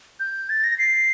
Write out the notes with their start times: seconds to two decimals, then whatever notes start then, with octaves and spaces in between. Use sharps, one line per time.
0.20 G6
0.49 A6
0.64 A#6
0.79 C7